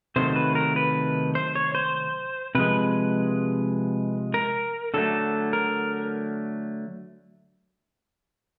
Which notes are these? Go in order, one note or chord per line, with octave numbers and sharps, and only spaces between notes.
C3 D#3 F#3 A3 C5
B4
A#4
B4
C5
C#5
C5
C3 F3 G#3 B4
A#4
D3 F#3 A3 A4
A#4